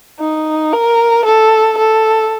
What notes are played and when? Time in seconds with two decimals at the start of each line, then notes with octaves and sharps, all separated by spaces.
0.20 D#4
0.73 A#4
1.25 A4
1.78 A4